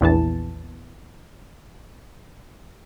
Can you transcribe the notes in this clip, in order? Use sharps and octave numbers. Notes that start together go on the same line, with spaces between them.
A#1 E2 E3 A5